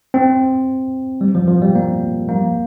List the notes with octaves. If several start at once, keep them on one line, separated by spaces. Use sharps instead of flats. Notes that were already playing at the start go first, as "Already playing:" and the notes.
C4
G3
F3
F3
G3
A#3
A#3